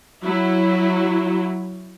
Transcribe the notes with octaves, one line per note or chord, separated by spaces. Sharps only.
F#3 E4